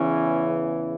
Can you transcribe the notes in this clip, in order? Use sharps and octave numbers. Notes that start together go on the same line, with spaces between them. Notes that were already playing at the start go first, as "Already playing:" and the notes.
Already playing: E2 C#3 E3 C#4